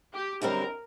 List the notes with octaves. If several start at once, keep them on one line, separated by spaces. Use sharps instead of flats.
G4
F#2 D3 G3 C4 D#4 A#4